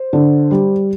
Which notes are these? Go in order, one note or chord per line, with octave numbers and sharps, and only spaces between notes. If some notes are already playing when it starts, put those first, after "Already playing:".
Already playing: C5
D3
G3